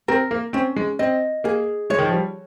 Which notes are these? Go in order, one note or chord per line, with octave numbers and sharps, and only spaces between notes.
C4 A#4
A#3
C4 C#4
G#3
C4 D#5
A#3 G#4
G#3 C#5
D#3
F3
G3